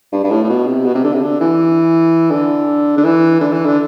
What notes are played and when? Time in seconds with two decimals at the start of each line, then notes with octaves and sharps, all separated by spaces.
0.12 G2
0.23 G2
0.31 A2
0.44 A2
0.49 B2
0.66 C3
0.85 B2
0.95 C3
1.04 D3
1.13 C3
1.22 D3
1.40 E3
2.31 D3
2.97 D3
3.05 E3
3.41 D3
3.53 E3
3.65 D3